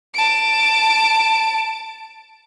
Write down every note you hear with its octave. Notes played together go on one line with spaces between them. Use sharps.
A5 D7